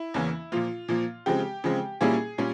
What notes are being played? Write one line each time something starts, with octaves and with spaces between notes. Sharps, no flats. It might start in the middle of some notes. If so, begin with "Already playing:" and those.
Already playing: E4
E2 C#3 E3 A#3 C#4
A#2 F3 A#3 F4
A#2 F3 A#3
C#3 F3 G#3 C4 G4
C#3 F3 G#3 C4
A#2 G3 A#3 C#4 E4 G#4
A#2 G3 C#4